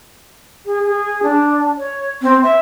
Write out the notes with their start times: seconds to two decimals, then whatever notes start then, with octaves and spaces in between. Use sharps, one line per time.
0.65 G#4
0.84 G#4
1.22 D4
1.77 C#5
2.21 C4
2.43 E5